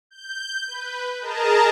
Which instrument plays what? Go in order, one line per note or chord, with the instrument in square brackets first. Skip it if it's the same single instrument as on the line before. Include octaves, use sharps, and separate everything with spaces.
[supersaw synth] G6
B4
G#4 A#4 D#5 A5 A#5